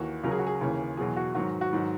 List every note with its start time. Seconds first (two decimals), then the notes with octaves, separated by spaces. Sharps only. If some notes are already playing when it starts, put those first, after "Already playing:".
Already playing: D#2 E3 F#4
0.23 C#2 C#3 F#3 A#4
0.31 G#4
0.39 F#4
0.47 G#4
0.61 D#2 C#3 E3
0.97 E2 B2 F#3 G#4
1.17 F#4
1.35 G#2 D#3 F#3 F#4
1.61 F#4
1.73 G#2 D#3 F#3